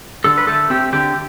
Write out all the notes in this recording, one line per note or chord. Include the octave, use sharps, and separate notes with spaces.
D3 A4
B4
A3 A4
C4 G4
D3 G4